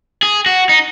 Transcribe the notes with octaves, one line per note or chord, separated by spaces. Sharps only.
G#4
F#4
D#4